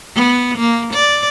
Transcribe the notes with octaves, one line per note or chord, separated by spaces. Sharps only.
B3
A#3
D5